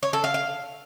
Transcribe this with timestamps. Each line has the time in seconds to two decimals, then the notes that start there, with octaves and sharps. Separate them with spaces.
0.03 C#5
0.13 A4
0.24 F5
0.34 F5